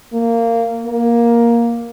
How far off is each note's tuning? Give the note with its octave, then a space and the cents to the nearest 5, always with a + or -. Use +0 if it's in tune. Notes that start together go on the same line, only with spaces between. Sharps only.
A#3 -15
A#3 +10